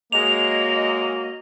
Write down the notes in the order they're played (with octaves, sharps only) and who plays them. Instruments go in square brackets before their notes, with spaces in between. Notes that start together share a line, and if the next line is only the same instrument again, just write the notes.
[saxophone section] G#3 [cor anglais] A#3 [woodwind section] F#4 C#5 D#5 [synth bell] F7